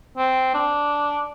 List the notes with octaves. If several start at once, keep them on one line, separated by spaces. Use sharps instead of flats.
C4
D4